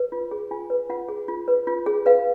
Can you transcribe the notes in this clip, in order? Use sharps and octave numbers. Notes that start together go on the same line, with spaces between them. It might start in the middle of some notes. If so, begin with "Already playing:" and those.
Already playing: B4
F4
G#4
F4 G#5
B4
F4 F#5
G#4
F4
B4
F4
G#4
B4 F5